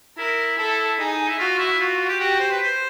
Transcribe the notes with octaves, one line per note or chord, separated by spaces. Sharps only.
E4 A#4
E4 A4
D#4 G#4
E4
F4 F#4
E4
F4 F#4
G4
F#4 G4
C5
B4
C5